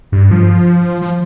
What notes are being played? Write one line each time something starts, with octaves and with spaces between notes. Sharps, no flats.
G2
F3
F3